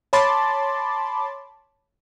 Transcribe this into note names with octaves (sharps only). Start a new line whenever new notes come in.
C#5 A5 B5 C6 D6 A6